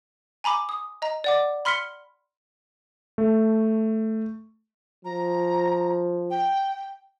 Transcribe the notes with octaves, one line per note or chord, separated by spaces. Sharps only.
G#5 A#5 B5 D6
D#6
D#5 A#5
D5 F#5 D6
B5 C6 F6 B6 C#7 G7
A3
F3 A#5
G5